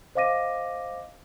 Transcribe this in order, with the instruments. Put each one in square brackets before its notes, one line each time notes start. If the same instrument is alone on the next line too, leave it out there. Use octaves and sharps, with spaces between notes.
[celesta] C5 D#5 F5 D6 A#6 D#7